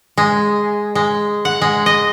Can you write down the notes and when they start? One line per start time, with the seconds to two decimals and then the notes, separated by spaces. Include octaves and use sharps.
0.18 G#3
0.95 G#3
1.45 F#5
1.62 G#3
1.86 D#5